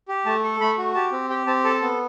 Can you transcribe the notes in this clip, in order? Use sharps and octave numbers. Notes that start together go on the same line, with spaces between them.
G4
A3 A5
A4
A3 B5
F#4
G4 A5
C4
G4 G5
C4 A5
A4 A5
B3